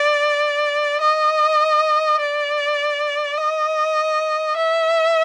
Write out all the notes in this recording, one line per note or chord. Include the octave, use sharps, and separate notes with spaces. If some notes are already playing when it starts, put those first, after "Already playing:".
Already playing: D5
D#5
D5
D#5
E5